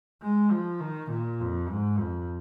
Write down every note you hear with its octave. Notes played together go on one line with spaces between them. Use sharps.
G#3
F3
D#3
A#2
F2
G#2
F2